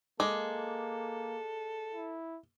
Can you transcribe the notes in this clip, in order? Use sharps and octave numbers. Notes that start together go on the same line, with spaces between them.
G#3 A#3 A4 D6
E4